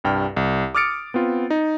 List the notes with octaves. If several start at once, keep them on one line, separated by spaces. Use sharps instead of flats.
C2 G2 G5 F6
C2
D6 D#6 F6 A6 C#7 D7
B3 C4 F4
D#4